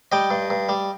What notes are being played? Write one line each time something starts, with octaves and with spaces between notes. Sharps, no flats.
G3 D#5 G5
G2
G2
G3